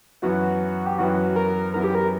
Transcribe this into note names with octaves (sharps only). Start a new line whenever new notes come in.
F#2 E3 B3 F#4
G4
F#2 E3 B3 F#4
A#4
F#2 E3 B3 A#4
G4
A#4